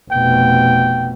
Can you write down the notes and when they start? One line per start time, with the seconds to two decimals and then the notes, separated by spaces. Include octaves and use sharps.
0.11 F1 B2 G5